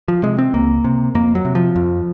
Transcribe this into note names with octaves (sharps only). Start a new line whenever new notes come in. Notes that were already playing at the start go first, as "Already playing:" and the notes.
F3
C3 G#3
C4
C#2 A#3
C3
F2 A#3
F#3
C3
F3
F2